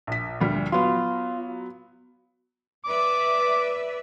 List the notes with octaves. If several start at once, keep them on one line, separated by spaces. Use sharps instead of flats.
A#1 B6
D2 A#2 G3
F#3 B3 F4
B4 D5 E5 D6